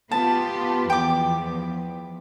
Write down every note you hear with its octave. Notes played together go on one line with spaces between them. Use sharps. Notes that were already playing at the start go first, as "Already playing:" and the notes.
B3 F4 G4 A5
E2 F3 B3 G5 D6